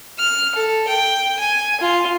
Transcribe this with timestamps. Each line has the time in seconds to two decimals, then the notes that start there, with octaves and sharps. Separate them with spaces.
0.19 F6
0.54 A4
0.87 G5
1.39 G#5
1.80 F4